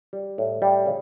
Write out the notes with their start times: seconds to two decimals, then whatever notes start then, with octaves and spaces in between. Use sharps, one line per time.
0.13 G3
0.38 A2
0.62 G3
0.86 C#3